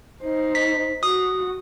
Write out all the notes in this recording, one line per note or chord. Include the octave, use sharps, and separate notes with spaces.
D#4 C5
B6
F#4 D#6